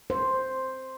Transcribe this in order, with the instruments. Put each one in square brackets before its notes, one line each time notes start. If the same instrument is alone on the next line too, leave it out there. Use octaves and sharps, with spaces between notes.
[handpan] C5